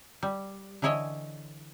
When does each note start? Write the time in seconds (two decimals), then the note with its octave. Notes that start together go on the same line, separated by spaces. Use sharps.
0.23 G3
0.82 D3 E3 E4 C#5 D#5 G#5